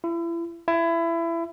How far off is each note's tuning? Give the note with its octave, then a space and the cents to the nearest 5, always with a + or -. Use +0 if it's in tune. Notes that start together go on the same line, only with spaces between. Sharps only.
E4 +35
E4 +25